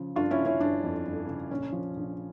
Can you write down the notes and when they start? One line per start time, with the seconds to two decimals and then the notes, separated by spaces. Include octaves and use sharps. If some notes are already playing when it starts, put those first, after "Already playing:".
Already playing: C#3 F3
0.16 G1 D4 F4
0.31 C#4 E4
0.39 C#3
0.46 C#4 E4
0.60 G1 D4
0.84 F2
1.06 G1
1.28 C#3
1.51 A#1 C#4
1.73 F3
1.96 A#1